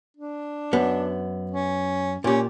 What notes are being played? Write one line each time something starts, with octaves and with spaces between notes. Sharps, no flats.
D4
F#2 B3
C#4
A#2 C#4 G4